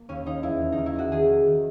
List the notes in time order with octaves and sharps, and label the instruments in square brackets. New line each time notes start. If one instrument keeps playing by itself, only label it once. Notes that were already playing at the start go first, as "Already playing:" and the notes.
Already playing: [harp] A#3
D#2 C#4
D#2 D#4
E2 E4
D#3
D#4
D#3
E4
E2 F#4
D#3 G#4
D#3
D#3